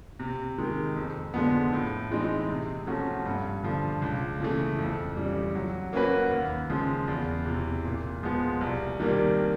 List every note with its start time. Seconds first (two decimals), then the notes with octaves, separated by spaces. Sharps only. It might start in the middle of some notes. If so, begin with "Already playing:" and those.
0.20 C3
0.58 D#3 G#3
0.96 F2
1.34 D3 F3 G#3 B3
1.73 A2
2.11 E3 G#3 C4 D#4
2.49 C3
2.87 F3 A3 C#4 F#4
3.25 G2
3.63 D3 F3
4.02 C#2
4.40 C#3 E3 A3
4.78 F2
5.17 C#3 E3 G3
5.55 F#3
5.93 A#3 C#4 F#4 B4
6.31 D#2
6.70 C#3 F3 G#3
7.08 E2
7.46 C3 E3
7.84 A#2
8.23 F3 G#3 B3
8.61 C2
9.00 C3 D#3 G3 A#3